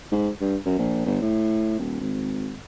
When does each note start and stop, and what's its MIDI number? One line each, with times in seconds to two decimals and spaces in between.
0.12 0.29 44
0.41 0.56 43
0.66 0.78 42
0.79 1.04 34
1.06 1.21 31
1.22 1.78 45
1.79 1.97 27
2.01 2.56 32